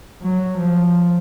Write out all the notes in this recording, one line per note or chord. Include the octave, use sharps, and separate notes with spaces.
F#3
F3